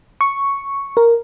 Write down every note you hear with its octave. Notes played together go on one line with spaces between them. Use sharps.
C#6
A#4